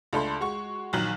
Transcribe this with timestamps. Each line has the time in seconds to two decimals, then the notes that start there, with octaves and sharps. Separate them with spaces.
0.13 C#2 A3 D4 B5 C6
0.41 G#3 F#4 C#6
0.93 A#1 D#3 F#3 F#6 F#7